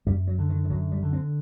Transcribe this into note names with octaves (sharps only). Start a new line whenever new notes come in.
F#2 G3
F#3
D3
D#3
D#3
F#2 F#3
G3
D3
C4